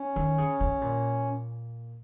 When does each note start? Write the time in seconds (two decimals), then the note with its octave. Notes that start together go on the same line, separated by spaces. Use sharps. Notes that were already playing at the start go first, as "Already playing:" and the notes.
Already playing: C#4
0.16 D#3
0.38 C#3
0.60 C#3
0.81 A#2